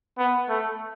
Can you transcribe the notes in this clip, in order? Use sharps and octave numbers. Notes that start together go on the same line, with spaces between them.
B3
A3